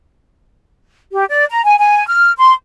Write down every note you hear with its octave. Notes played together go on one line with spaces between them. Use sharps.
G4
D5
A#5
G#5
G#5
F6
C6